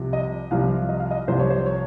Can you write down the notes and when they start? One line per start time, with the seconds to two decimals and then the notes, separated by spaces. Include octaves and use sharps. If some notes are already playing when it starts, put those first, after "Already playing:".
Already playing: C2 C3 F3
0.13 D#5
0.51 C2 C3 F3 F5
0.89 D#5
1.00 F5
1.11 D#5
1.28 C2 C3 F3 C5
1.39 C#5
1.50 C5
1.66 C#5